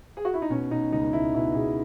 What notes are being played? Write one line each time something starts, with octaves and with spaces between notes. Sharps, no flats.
G#4
F#4
E4
D#4
B2 C#4
B2 D#4
C#2 D#4
C#2 E4
B2 E4
B2 G#4